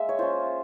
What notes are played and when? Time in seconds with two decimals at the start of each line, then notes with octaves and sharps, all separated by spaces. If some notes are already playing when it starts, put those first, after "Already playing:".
Already playing: G#3 A#3 E5
0.09 C#5
0.19 C#4 F4 C5